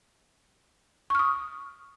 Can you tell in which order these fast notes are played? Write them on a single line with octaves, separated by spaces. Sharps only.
C#6 F6 D#6